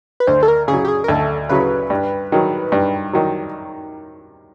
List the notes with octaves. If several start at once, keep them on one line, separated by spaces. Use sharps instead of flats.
B4
D2 C5
A4
A#4
C#3 G#4
F#3
G4
G#4
A#4
D2 A4
C#3 F#3 B4
G2
D#3 F#3
G2
D#3 F#3